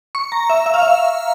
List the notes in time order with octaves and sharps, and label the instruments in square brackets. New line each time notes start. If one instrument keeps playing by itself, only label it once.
[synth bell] C#6
A#5
E5
E5
F5
E5